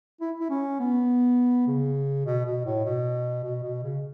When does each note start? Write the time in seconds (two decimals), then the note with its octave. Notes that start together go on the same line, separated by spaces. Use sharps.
0.21 E4
0.40 E4
0.50 C#4
0.80 B3
1.67 C#3
2.26 B2
2.46 B2
2.65 A2
2.85 B2
3.44 B2
3.63 B2
3.83 C#3